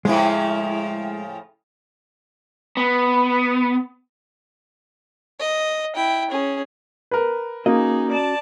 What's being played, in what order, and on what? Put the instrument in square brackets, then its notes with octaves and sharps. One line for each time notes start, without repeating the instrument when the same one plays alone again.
[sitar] A2 C#3 F3 [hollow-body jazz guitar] G#3 E4
[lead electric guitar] B3
[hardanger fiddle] D#5
E4 G5
C#4 G#4
[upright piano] A#4 B4
[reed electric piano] A#3 [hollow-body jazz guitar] C#4 F#4 D#5 [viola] D#4 G#4
[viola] D5 A5